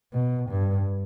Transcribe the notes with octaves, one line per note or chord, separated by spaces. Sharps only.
B2
G2